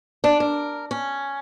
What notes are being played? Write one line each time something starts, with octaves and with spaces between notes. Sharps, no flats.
D4
A#4
C#4